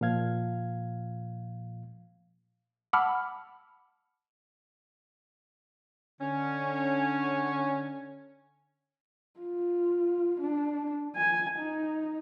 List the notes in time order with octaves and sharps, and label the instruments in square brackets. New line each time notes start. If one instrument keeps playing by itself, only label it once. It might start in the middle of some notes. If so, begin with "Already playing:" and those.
[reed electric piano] A#2 F3 F5 G#6
[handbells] F#5 A5 B5 D6 E6 F6
[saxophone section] D3 C#4
[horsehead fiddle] F4
D4
G#5
D#4